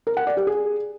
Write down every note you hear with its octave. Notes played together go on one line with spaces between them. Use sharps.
A#4
F#5
D5
G4
G#4